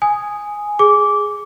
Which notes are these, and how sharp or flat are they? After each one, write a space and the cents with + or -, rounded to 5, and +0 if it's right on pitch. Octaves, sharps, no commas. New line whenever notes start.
G#5 +0 D#6 +0
G#4 +0 D6 -15